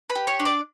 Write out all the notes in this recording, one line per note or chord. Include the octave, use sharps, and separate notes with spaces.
B4 B5
G4
C#5 C#6
D4
D5 D6